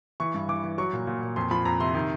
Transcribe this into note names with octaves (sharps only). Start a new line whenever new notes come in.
E3 C#6
G2
E3 D6
E3
F#3 C#6
A#2
A#2
A#2
F2 C6
F3 B5
F2 A#5
C3 C6
D#3